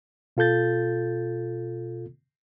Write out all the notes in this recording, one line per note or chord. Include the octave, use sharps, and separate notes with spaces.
B2 F4 A4 G6 A6